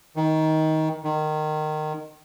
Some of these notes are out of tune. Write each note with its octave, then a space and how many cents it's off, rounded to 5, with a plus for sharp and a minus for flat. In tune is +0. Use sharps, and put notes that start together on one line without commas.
D#3 +20
D#3 -20